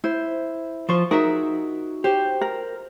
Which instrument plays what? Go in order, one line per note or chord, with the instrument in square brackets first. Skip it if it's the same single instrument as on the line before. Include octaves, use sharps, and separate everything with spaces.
[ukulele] E4 [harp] C5
[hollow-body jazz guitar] F3 C5 [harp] F4 C#6
[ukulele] D#4 [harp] F#4 G#4 E5 [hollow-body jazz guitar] A#4
[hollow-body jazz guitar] G4 [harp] C5
[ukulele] A#4